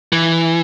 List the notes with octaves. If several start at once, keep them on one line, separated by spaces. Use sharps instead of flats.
E3